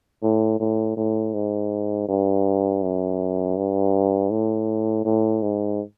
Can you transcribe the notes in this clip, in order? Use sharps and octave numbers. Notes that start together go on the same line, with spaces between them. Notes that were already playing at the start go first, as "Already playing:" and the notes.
A2
A2
A2
G#2
G2
F#2
G2
A2
A2
G#2